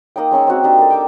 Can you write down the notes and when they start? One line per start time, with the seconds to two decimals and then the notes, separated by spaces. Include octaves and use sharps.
0.16 A#3 D#4 D#5 G5
0.31 G#3 C#4 C#6 E6
0.47 C4 F#4
0.63 D4 D#4 G4 E6
0.78 A#3 A4
0.90 G5 D6 E6